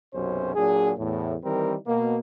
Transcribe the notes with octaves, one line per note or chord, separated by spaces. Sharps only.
B1 F#2 C3 C#4 C5
A#2 F#3 D4 G#4
E2 A2
D#3 E3 G3 C4 A#4
B2 A#3